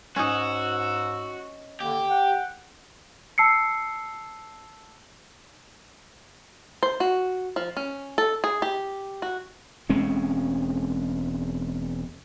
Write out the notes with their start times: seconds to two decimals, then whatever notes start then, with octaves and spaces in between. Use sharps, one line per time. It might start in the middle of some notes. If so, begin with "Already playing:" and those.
0.16 G#2 C#4 D#4 F#4 E6
1.80 D3 A#3 G4
2.08 F#5 G5
3.38 A5 E6 C7 C#7
6.83 C5
7.00 F#4
7.56 F3
7.77 C#4
8.18 A4
8.44 G#4
8.62 G4
9.22 F#4
9.89 E1 G#3 C4 C#4